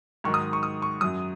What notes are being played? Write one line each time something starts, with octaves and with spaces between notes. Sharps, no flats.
G#2 D#3 F#3 C#6
D#6
C#6
D#6
C#6
F#2 F#3 D#6